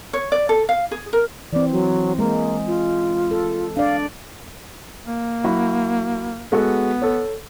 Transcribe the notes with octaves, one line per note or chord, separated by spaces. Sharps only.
C#5
D5
A4
F5
G#4
A#4
E3 C4 D5
F#3
G#3 A#3
F4
A4
D4 D5 F5
A#3
F#3 E4 F#4
G#3 B3 F#4 A4
A4 C#5